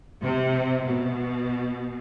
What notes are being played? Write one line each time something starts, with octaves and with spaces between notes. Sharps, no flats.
C3
B2